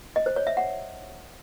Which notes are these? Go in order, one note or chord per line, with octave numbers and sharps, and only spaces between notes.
D#5
C5
C#5
E5
F#5